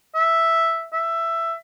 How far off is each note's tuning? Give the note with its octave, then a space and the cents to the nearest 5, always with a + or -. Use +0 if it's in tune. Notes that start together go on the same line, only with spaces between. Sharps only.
E5 +0
E5 +10